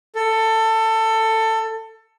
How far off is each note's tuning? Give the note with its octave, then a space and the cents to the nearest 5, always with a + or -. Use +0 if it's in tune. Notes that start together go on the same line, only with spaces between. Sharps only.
A4 +20